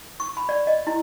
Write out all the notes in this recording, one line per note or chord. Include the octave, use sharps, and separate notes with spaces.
C#6
B5
D5
D#5
E4